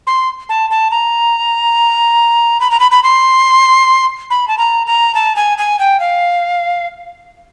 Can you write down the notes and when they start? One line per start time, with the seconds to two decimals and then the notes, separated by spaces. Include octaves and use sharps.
0.07 C6
0.49 A5
0.70 A5
0.91 A#5
2.60 B5
2.71 A#5
2.80 B5
2.91 B5
3.03 C6
4.30 B5
4.48 A5
4.58 A#5
4.87 A#5
5.15 A5
5.36 G#5
5.58 G#5
5.79 G5
6.00 F5